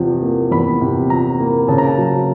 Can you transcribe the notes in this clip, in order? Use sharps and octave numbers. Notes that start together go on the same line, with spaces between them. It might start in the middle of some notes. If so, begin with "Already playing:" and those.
Already playing: E2 C3 F3
A#3
E2 B5
C3
F3 A#5
A#3
C#3 A5
A#5
A5
F#3